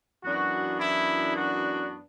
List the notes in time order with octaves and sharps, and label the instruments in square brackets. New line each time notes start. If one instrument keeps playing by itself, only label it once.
[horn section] F#2 E3 B3 D4 F#4
E4
F#4